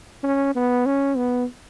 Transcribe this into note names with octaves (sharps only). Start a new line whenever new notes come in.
C#4
B3
C#4
B3